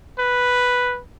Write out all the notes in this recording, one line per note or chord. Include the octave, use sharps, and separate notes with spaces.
B4